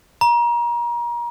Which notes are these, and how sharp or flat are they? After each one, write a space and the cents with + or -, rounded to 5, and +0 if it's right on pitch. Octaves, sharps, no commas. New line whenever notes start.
A#5 +30